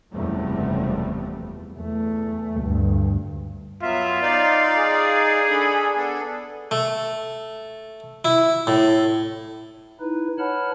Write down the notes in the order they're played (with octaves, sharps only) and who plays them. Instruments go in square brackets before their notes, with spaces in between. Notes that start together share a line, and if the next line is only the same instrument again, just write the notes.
[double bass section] F#1 E2 C3 F3 G3 A3
[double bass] E2 A3
D2 G2
[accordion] F#3 B3 E5 [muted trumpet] F4
[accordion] D#4 D5 F5
[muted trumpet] G#4
[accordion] D4 A4 B5
B3 D4 A4
[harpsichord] A3
E4
A2
[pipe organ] D#4 E4 B4
B4 C#5 F#5 A5 B5 F6